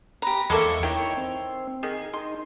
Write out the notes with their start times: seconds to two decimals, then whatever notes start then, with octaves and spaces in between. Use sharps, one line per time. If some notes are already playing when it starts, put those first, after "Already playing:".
0.22 G4 B4 A#5 A#6
0.50 E2 G#3 A#3 A4 C5 E5 C6 C#6
0.83 D#3 E4 C#5 G5
1.17 C4
1.83 D#3 G#4
2.14 D#4 C6